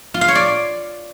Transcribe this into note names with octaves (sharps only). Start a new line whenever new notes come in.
F4
F5
C#5
D5